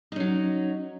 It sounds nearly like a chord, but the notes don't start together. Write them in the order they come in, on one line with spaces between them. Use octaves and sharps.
D#4 C#4 F#3